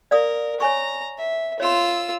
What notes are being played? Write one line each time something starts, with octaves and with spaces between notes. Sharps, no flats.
A#4 D5 F5 D#6
C#5 G#5 A#5 C#6
E5
F4 C#5 C6 E6